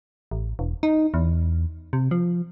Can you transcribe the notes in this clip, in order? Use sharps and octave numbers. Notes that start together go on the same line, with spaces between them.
A1
E1
D#4
E2
C3
F3